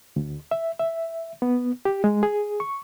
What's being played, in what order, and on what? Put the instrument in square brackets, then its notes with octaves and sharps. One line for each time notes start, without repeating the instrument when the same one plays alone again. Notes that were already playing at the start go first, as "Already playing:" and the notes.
[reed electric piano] D2
E5
E5
B3
G4
G#3
G#4
C#6